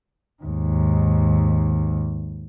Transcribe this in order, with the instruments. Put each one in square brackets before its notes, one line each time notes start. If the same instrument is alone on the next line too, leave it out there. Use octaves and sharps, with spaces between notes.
[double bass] D#2 G#2